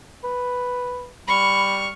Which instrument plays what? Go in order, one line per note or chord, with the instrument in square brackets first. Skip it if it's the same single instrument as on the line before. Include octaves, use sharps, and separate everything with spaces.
[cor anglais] B4
[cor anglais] G3 [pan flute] B5 [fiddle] C#6 F6